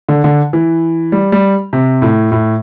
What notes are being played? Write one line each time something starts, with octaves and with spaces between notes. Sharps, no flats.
D3
D3
E3
G3
G3
C3
A2
A2